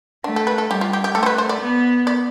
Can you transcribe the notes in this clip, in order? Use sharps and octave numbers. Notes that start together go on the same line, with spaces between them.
A3 D4
A4
B4
A4
G3 G4
F4
G4
G4
A3 A4
C5
B4
C5
D5
B3
D5